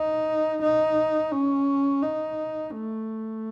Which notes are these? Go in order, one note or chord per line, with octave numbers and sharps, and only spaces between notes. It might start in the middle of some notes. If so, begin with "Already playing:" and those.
Already playing: D#4
D#4
C#4
D#4
A3